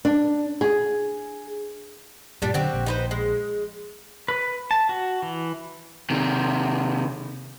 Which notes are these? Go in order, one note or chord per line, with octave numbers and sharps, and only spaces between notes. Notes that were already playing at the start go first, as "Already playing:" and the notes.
D4
G#4
G2 A#2 G3 D4 G4
D3 F#3 C4 F#4 G4
A#1
D#4 B4 C5
G#3
B4
A5
F#4
E3
C3 D#3